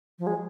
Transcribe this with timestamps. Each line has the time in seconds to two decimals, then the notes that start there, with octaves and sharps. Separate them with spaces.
0.19 F3
0.27 G#3